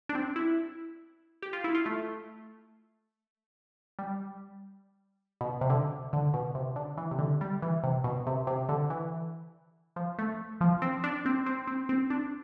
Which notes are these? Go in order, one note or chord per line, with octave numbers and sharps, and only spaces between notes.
D4
C4
E4
G4
F4
E4
F4
A3
G3
B2
C3
D3
D3
B2
C3
D3
E3
C3
D3
G3
E3
C3
B2
C3
C3
D3
E3
F3
A3
F3
C4
D4
C4
C4
C4
C4
D4